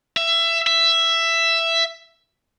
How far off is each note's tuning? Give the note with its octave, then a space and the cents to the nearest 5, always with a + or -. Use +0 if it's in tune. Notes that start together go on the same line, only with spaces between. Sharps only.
E5 +20
E5 +10